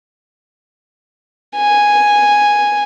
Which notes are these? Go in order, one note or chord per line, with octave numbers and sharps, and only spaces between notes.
G#5